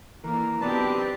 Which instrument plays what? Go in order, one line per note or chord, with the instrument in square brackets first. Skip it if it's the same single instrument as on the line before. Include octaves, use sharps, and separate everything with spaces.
[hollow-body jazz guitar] E3 [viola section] A3 A#3 D4 [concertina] A#4
[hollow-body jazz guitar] B1 B2 [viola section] C4 D#4 G4 [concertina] D4 B4 A5